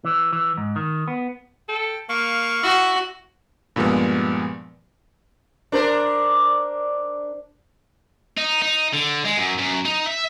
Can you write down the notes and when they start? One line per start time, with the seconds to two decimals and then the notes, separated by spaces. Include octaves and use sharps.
0.05 E3
0.33 E3
0.57 G#2
0.76 D#3
1.08 B3
1.69 A4 G5
2.09 A#3 F5 C#6
2.63 E4 F#4
3.76 G2 A#2 F3 G#3 B3
5.72 D4 A#4 C5
8.38 D#4
8.62 D#4
8.93 D3
9.25 G#3
9.37 F#2
9.59 F#2
9.85 D#4
10.06 E5